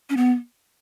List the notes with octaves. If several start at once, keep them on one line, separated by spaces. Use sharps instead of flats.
C#4
B3